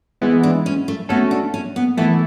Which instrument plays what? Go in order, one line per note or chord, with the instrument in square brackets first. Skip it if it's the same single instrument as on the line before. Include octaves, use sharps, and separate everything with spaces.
[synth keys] E3 G#3 B3 E4
[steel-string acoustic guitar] D4
C#4
A3
[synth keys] A3 C#4 F#4 A4 [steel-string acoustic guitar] B3
[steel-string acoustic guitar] D4
C#4
B3
[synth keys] E3 A3 E4 A4 [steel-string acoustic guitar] B3